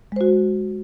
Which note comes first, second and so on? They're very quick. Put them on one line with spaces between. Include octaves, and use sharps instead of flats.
G#3 C5 F#4